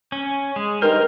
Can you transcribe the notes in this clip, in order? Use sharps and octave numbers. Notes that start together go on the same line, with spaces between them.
C#4
G#3
G2 D#3 A#4 C5 F6